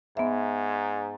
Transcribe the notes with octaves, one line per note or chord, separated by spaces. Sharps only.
G#2 B3 E5